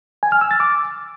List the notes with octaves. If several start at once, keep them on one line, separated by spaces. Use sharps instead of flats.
G#5
F6
E6
A6
D6